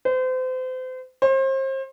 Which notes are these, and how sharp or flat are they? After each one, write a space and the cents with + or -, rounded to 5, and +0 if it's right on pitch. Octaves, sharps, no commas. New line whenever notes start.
C5 -35
C5 +35